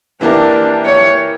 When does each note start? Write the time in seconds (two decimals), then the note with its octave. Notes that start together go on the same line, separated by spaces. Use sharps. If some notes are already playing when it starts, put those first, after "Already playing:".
0.21 E3 A#3 D4 E4 G4 A#4
0.85 C#5